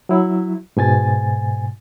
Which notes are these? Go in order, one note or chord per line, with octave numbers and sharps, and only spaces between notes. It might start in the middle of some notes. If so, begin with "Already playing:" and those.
F#3 E4
G#2 B2 G#5 A6